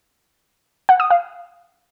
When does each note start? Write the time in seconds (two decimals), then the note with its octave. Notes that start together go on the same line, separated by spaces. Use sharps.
0.89 F#5
1.00 D#6
1.10 F5